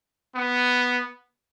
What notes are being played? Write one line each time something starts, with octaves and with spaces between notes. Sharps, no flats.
B3